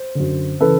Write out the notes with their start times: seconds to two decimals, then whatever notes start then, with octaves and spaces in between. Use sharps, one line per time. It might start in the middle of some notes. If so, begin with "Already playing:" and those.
Already playing: C5
0.15 F#2 D3
0.60 C#3 E3 A4 B4